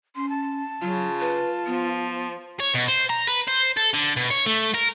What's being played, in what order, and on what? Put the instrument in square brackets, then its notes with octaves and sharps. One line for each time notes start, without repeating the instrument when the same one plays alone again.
[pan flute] C#4 [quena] C6
[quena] A5
[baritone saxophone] C#3 [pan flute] F#3 [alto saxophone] F4
[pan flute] B4
[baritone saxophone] F3 [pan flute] B3
[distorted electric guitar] C#5
B2
C5
A#5
B4
C5
A4
D3
B2
C#5
A3
A#4